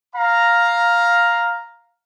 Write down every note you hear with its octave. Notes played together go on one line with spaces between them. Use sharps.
F5 A#5